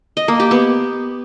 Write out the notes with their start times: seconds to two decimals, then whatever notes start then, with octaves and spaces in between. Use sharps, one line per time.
0.17 D#5
0.28 A#3
0.40 G4
0.51 B3